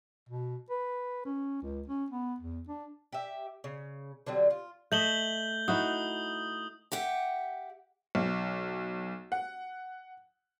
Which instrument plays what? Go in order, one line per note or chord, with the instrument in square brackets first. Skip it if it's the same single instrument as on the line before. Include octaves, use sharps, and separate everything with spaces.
[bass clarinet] B2
B4
C#4
C#2
C#4
B3
E2
D4
[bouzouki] G4 E5
C#3
D3 F#3 G3 C4
F4
[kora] A3 D#5 E5 [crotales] G6 F#7 G7
[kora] D#4 E4 F#4 [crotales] D#6
[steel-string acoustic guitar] G4 E5 F#5 G5
[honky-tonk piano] B1
F#5